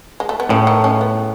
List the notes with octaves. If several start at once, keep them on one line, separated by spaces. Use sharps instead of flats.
G#3
A3
B3
A2 C#3 C#4
D#3 D#4
C#3 C#4
B3